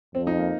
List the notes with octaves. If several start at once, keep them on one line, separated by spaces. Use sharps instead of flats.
F2 C4
D#4
A#3